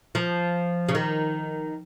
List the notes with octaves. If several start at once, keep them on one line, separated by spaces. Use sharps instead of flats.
F3
C#3
D#3